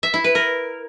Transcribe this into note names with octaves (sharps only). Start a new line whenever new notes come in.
E5
E4
B4
A#4